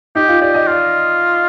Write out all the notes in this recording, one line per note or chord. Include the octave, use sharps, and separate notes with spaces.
D#4 G4
F4
G4 D5
D#5
F4 D5